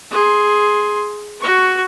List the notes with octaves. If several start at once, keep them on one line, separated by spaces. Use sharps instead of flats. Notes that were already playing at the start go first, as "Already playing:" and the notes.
G#4 C6
F#4 C#6